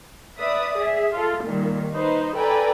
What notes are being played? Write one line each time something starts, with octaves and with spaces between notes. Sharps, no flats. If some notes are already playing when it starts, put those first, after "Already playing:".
B4 D5 E5 D#6
G#4 E5
F4 A4
A#2 D#3 G3
D#4 B4 C5
A4 B4 D5 G5 G#5 A#5